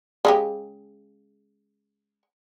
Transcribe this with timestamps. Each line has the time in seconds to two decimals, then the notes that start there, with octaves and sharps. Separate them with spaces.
0.25 C#3 G#3 G4